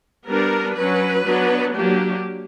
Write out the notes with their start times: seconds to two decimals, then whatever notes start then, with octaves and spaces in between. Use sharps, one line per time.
0.27 G3 B3 D4 A#4
0.76 F#3 C#4 B4
1.25 F#3 B3 D4
1.73 F#3 A#3 D4 G4